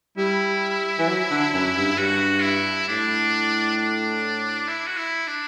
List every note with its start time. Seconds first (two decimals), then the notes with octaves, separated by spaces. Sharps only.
0.17 G3 E4
0.99 E3
1.09 F#3
1.30 D3
1.54 F#2
1.76 G2
1.98 G2 F#4
2.43 E4
2.88 A2 D4
3.78 D4
4.68 E4
4.87 F#4
4.97 E4
5.27 D4